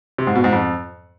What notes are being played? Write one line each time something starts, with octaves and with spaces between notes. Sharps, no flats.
C3
G#2
B2
G#2
F2